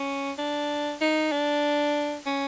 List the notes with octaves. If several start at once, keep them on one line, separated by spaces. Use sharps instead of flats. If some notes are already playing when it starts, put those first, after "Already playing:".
Already playing: C#4
D4
D#4
D4
C#4